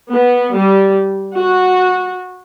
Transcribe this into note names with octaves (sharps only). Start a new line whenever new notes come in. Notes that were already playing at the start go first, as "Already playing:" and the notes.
B3
G3
F#4